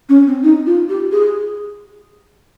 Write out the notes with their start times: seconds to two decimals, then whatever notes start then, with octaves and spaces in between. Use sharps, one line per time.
0.09 C#4
0.27 C4
0.43 D#4
0.66 F4
0.89 G4
1.12 G#4